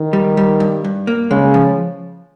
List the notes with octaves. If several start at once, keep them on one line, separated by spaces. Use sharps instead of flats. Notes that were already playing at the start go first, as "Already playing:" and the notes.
Already playing: D#3
G3
G3
G2
G2
A#3
C#3 G#3
F3